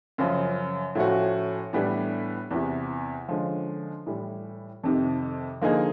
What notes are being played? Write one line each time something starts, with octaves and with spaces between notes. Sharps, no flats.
F#2 C#3 F3
A2 F3 A3 C#4 F#4
A2 E3 G3 B3 D4
E2 C3 E3
D3 F3 G#3 C#4
A2 E3 G3
F2 C3 D#3
D3 F3 A#3 D#4 G#4